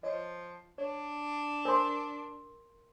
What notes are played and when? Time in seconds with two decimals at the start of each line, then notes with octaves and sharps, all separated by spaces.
0.03 F3 C#5 D#5
0.78 D4 C#5
1.65 A#4 C5 G#5 C6 D6